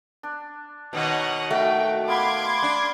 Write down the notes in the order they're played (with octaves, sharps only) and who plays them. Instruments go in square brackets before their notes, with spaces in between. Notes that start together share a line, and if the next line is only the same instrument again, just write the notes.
[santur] D4
[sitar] B2 D#3 A#3 [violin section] C#5 D#5 F#5
[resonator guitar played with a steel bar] A3 [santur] F#4 [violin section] G5
[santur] B3 F5 B5 [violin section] C6 D6 G#6
[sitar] D4